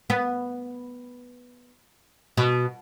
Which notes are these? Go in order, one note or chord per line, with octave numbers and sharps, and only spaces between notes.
B3
B2